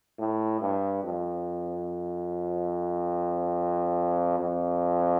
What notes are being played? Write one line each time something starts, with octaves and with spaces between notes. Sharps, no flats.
A2
G2
F2
F2